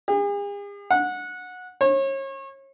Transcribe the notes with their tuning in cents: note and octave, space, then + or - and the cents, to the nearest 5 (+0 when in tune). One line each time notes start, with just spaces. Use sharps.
G#4 -45
F#5 -20
C#5 -35